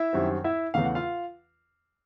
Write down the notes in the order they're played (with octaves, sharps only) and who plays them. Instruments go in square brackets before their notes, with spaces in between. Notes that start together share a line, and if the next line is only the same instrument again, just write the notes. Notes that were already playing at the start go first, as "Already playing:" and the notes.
Already playing: [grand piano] E4 E5
F#2 D#3 G3 C4
E4 E5
E2 C#3 E3 A3 F5
F#5
F4 F5